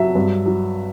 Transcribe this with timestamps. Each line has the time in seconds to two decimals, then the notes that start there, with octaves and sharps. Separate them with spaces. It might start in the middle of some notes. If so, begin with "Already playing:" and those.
Already playing: F#3 E5
0.15 G2
0.46 F#3